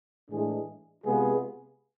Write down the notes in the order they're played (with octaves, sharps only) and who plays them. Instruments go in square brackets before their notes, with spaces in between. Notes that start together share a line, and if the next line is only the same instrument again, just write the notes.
[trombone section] A2 E3 G#3 D4 G#4
C3 G#3 B3 F4 G#4